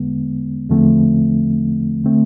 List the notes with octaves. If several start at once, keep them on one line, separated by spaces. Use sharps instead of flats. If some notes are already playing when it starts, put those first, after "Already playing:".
Already playing: E2 D3 G#3 B3
E2 D3 F3 A3 C4
D3 A3 C4